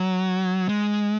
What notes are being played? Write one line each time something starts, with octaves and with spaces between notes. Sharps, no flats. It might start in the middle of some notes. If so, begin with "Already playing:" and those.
Already playing: F#3
G#3